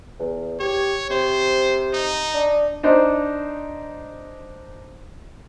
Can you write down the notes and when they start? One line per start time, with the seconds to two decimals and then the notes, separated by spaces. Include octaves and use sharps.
0.19 E2
0.60 G4 C#5
1.10 C3 C5
1.94 D#4
2.34 D4
2.83 D4 D#4 C5